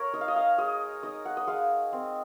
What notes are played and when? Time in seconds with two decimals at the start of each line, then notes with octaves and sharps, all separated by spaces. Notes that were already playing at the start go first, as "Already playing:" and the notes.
Already playing: A#4 C#5
0.14 D#4 D#5
0.21 F5
0.28 D#5
0.36 F5
0.58 G#3 D#5
1.03 D#4 D#5
1.25 F#5
1.37 D#5
1.47 G#3 F5
1.93 C4